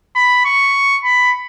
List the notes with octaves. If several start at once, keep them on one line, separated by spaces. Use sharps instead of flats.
B5
C#6
B5